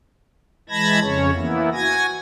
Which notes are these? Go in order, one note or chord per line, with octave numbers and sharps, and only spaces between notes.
E3 G#3 A5 B5 G#6 A#6
F2 C#3 C#4 C#5
E3 A#3 B3 E4
F#4 G#5 G#6 A#6